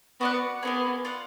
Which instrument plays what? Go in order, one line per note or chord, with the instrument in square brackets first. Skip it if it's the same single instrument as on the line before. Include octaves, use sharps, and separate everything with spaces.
[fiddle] B3 [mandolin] F#4 D5 F#5
[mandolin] A#3 D#4 G#4 [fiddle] B3
[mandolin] F4 B4 D5 F#5